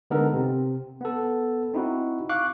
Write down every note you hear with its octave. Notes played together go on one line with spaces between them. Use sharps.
D3 G#3 B3 D#4 A4 A#4
C3 C4
B3 A4
C4 D#4 E4 F#4
F5 C#6 D6 F#6